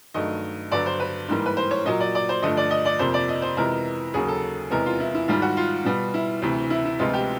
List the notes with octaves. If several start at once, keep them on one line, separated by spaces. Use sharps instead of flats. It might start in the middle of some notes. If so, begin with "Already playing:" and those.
G2 D#3 F#3 A3 D#5
G2 D3 F#3 B3 D5
C5
B4
G#2 E3 G3 A#3
B4
C5
C#5
A#2 F#3 A#3 D#5
D5
D5
C5
G2 D3 F3 A3 D#5
D5
D#5
D5
F2 C3 F3 A#3 C5
D5
D#5
C5
F2 C3 E3 G#3 B3 A#4
D#2 C#3 F#3 A#3 G#4
A4
E2 C3 E3 G#3 B3 A#4
F4
E4
E4
G#2 D#3 G3 F4
F#4
F4
B2 G3 B3
E4
D2 C3 E3
E4
E4
D2 C3 F3 G#3 B3 F4
G4